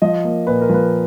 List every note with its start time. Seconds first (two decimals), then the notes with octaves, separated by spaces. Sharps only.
0.02 F3 D#5
0.24 A#3
0.47 A#2 B4
0.61 A#4
0.69 F3 B4